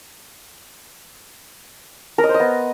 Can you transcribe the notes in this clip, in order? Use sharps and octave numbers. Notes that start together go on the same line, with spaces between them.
A#4
D#5
C5
D#5
B3